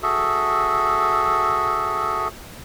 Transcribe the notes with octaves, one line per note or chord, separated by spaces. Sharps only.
F#4 G#4 A4 E5